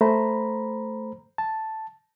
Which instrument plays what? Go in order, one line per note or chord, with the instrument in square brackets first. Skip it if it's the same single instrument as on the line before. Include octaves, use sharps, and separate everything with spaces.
[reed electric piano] A3 C5 A#5 B5
A5